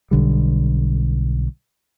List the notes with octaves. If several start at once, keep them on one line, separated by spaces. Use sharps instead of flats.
B1 D3 G3